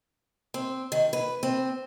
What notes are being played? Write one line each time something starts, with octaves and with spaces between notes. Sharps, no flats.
C4
D#3
B4
C4